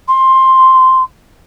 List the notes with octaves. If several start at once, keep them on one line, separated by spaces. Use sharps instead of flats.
C6